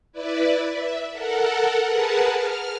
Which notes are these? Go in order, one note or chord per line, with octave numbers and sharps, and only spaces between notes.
E4 B4 D5
E5
A4 A#4 F#5
G#4 A#4 B4 F#5 A5
F6